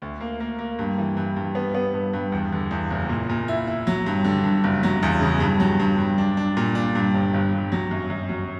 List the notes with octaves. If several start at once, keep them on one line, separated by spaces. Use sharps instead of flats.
D2
A#3
A#3
A#3
G2
E3
G2
G2
B3
B3
G2
G2
E2
D3
E2
F#1
A#2
A#2
E4
E4
F#3
G2
D3
G2
F#1
F#3
E2
C#3
G2
F#3
G2
G2
D4
D4
A#2
D4
G2
G1
G1
G2
F#3
F#2
F#2
F#3